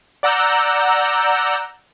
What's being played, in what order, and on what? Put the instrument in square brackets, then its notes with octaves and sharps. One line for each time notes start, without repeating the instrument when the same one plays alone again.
[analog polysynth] D5 F#5 A#5 E6 G6